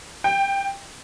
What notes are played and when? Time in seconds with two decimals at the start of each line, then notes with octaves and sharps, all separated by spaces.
0.24 G5